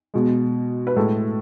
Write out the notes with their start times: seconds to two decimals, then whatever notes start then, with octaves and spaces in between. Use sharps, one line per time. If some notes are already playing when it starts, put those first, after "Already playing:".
0.14 B2 G#3
0.87 B4
0.96 A2 G#3 A4